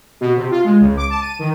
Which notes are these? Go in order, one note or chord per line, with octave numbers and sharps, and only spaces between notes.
B2
C3
F4
G#3
C#2
D6
A5
D#7
D#3